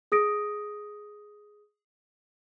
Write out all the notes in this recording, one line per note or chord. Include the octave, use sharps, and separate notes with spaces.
G#4 D#6 A#6 D7